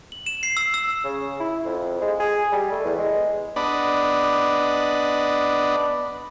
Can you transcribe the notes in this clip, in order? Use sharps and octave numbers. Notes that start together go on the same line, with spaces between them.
F#7
E7
C7
E6
E6
C#3
E4
F2
G#3
G#4
G3
A3
E2
G#3
B3 D4 D5 D#5 B5